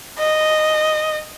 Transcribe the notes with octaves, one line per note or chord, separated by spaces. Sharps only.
D#5